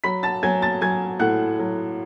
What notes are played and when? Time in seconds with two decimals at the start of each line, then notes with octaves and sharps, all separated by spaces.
0.04 F#3 B5 B6
0.23 A5 A6
0.43 F#3 G#5 G#6
0.62 A5 A6
0.81 F#3 G#5 G#6
1.19 A2 F#5 F#6
1.59 F#3